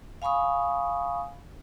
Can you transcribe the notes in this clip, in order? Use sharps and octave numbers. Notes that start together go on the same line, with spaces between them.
F5 G#5 B5 C#6 D#6